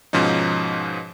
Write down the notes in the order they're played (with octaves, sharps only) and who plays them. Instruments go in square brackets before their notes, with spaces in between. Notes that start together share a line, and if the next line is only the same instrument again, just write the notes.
[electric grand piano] G#2 B2 F3 C#4 D#4